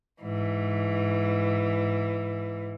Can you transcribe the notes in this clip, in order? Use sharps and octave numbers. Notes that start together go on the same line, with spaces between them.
G#2 E3